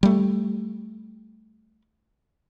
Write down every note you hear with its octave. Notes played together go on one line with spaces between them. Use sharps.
G3 A3